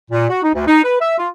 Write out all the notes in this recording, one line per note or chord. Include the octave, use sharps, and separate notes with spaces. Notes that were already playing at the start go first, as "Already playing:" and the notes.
A#2
F#4
D#4
D2
D#4
B4
E5
F4